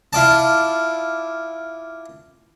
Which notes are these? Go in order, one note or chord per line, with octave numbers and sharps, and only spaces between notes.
E4 F4 D5 A5